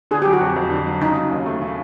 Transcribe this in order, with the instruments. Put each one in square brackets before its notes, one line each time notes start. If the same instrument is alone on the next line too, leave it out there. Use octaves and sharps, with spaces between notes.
[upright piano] D3 [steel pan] G#4
[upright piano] F#3 [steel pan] G4
[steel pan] F#4
[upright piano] F2
F2
D3
F#3
[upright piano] C#3 [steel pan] D#4
[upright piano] F#3
D#2
A3
C#3